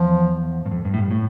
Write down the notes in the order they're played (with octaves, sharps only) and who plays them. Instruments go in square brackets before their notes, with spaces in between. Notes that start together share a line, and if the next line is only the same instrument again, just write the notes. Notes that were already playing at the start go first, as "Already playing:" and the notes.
Already playing: [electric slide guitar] E2 [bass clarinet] F3
[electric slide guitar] G2
F2
G2
A2
G2
A2